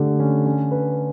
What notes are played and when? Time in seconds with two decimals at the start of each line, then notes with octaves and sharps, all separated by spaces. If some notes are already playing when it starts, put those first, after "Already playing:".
Already playing: D3 A3 G4
0.20 C#4
0.46 C#4
0.71 B4